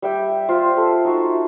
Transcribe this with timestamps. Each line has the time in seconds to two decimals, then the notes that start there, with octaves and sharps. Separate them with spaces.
0.02 G3 E5 G5
0.49 F4 C5 E5
0.77 A4
1.05 D#4 F#4 E5